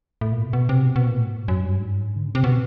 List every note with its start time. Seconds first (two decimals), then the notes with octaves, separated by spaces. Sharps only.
0.21 A2
0.32 A#2
0.43 B2
0.53 B2
0.69 C3
0.85 B2
0.96 B2
1.06 A#2
1.17 A2
1.27 G#2
1.48 F#2
1.64 G2
1.80 G#2
2.16 D3
2.26 C#3
2.35 C3
2.44 B2